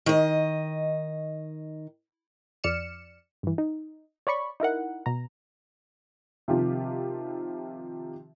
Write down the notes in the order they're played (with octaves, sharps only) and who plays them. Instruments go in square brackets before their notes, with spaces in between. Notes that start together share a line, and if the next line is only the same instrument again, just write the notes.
[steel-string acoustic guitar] D#3 D#5
[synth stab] F2 D5 F6 C#7 E7
G2 E3
D#4
C#5 D5 B5 C#6
D#4 E4 A#4 F#5
B2 A#5
[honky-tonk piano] C3 D#3 F3 C4 F4 G4